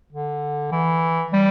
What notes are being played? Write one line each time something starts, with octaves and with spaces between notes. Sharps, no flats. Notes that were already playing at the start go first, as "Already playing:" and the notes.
D3
E3
G3